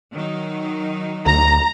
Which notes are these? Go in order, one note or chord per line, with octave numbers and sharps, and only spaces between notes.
D#3 F#3 D#4
D2 A#5